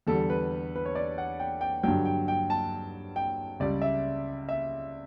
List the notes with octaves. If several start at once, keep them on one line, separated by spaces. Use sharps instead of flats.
E2 D3 G3 A4
B4
B4
C#5
D5
F#5
G5
G5
G2 D3 F#3 G5
G5
G5
A5
G5
C#2 C#3 G3 D5
E5
E5